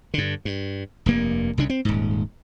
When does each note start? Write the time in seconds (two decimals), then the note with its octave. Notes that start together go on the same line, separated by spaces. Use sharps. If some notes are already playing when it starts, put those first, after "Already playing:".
0.14 G2 D3
0.45 G2
1.06 F1 G2 A#3
1.58 C2 C#3 D4
1.70 C4
1.85 D#1 G#2